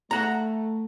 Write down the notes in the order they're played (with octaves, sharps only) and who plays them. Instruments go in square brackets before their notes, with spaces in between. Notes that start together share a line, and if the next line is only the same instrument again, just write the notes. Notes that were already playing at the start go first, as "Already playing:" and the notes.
[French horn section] A3 [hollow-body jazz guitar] F#5 A#5